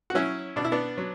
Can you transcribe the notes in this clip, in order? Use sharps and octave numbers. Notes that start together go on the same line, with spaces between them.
F#4
F#3 C#4 E4
B2 D4
E4
B3 D4
F#3